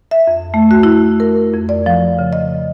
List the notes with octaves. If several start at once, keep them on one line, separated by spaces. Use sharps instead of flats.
E5
F2
A3
F#4
E4
A#4
F2
D5
F3
C#3
D#5